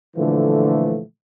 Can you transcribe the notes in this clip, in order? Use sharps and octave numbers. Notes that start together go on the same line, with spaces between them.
A#2 D3 E3 F3 A3